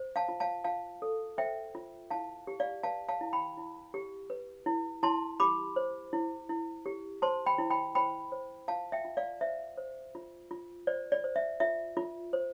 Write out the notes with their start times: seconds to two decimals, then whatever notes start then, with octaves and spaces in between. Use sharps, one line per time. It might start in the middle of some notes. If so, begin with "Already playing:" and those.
Already playing: C5
0.16 F5 A5
0.29 F4
0.40 F5 A5
0.64 F4 F5 A5
1.02 A4
1.38 C5 E5 G5
1.75 F4
2.10 E4 F5 A5
2.47 G4
2.60 D5 F5
2.83 B4 F5 A5
3.08 F5 A5
3.21 E4
3.33 G5 B5
3.57 E4
3.94 G4
4.30 B4
4.66 E4
5.03 E4 A5 C6
5.40 G4 B5 D6
5.76 C5
6.13 E4
6.49 E4
6.86 G4
7.22 C5 A5 C6
7.46 G5 B5
7.58 E4
7.70 G5 B5
7.95 C5 G5 B5
8.32 C5
8.68 F4 F5 A5
8.92 E5 G5
9.05 F4
9.17 D5 F5
9.41 C5 E5
9.77 C5
10.15 F4
10.51 F4
10.87 C5 D5
11.12 D5
11.24 C5
11.36 E5
11.60 F4 E5
11.97 F4
12.33 C5